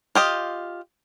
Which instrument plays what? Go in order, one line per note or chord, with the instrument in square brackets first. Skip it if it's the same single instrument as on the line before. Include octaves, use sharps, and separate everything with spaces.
[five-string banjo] F4 G4 D#5